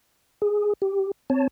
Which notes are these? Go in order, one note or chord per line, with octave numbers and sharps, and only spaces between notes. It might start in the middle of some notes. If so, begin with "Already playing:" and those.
G#4
G4
C4 C#5 A5